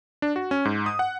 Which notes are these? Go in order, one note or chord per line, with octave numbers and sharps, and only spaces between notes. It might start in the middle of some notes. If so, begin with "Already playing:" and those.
D4
F#4
C#4
G#2
D#6
F#5